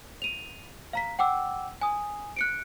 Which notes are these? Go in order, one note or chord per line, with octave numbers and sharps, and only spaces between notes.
D#7 F7
F5 A#5 B6
F#5 G5 D6 E6
G#5 D#6
F#6 C#7 D7